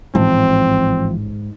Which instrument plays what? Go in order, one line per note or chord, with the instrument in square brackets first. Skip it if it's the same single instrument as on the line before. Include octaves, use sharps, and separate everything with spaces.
[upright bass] A1 [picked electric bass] G#2 [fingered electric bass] E3 F3 [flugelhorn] C4